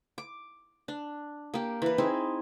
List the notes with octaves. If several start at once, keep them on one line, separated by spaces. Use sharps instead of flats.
D6
D4
A#3 G4
E3 B4
C4 D#4 E4 G#4